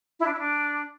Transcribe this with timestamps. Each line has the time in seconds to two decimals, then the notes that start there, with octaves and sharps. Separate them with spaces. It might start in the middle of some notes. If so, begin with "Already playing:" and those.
0.19 E4
0.26 D4
0.32 E4
0.39 D4